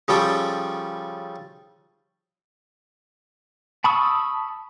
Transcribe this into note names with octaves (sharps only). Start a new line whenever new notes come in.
C#3 F3 G3 A4 G5
A5 B5 C#6 D#6 E6